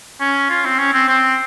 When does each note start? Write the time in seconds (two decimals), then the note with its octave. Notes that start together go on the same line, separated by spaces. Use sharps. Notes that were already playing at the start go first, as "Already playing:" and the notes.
0.20 C#4
0.50 F4
0.65 C4
0.79 C#4
0.93 C4
1.08 C4